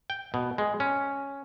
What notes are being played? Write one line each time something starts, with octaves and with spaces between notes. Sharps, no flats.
G5
B2
G#3
C#4